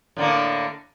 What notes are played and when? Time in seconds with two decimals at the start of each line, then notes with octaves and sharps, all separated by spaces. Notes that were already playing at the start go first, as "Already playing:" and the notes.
0.17 A2 D3 A#3